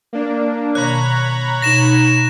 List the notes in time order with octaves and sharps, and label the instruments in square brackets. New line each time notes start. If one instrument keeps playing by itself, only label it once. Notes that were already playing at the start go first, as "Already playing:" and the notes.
[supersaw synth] A#3 D4
[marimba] B2 D#3 [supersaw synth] C#5 A#5 B5 [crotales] F#6
[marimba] B2 D#4 [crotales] A#6 E7